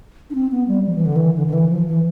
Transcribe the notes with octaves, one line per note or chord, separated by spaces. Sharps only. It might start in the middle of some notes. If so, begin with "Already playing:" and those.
D4
C4
B3
G3
F3
E3
D3
E3
D3
D3
E3
F3
E3